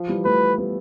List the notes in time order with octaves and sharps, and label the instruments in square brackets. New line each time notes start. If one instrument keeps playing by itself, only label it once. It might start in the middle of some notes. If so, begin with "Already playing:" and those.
Already playing: [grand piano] F3
E3 G3
[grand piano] F3 A3 [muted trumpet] B4
[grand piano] G3 B3